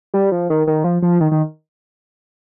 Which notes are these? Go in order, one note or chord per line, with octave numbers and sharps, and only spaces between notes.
G3
F3
D#3
D#3
F3
F3
D#3
D#3